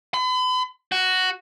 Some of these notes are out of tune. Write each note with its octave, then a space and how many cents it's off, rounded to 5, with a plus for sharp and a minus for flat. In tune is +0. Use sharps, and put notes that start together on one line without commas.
B5 +40
F#4 +5